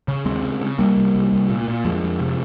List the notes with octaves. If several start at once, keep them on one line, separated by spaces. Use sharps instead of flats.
C#3
D#2 G#3 C4
C#3
C#3
C2 G3 A#3
C2
C2
C2
A#2
A#2
F2 F3 G#3
F2
C3